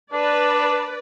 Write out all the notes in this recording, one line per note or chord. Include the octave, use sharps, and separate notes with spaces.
D4 B4 D5